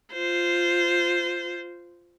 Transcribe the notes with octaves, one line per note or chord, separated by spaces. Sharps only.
F4 C5